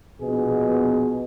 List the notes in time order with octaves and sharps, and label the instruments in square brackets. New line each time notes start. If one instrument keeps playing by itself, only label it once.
[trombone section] A#1 B2 B3 G#4